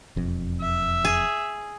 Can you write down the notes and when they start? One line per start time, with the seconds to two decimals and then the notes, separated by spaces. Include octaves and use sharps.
0.16 E1 F2
0.61 E5
1.05 G#4